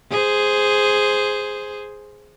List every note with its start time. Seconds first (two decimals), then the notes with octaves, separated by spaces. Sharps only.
0.11 G#4 C5